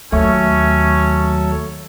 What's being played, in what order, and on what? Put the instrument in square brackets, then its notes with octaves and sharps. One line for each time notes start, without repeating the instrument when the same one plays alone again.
[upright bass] D#2 [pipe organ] F#3 A4 C#5 [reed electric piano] A3 E5 C#6 [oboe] C#4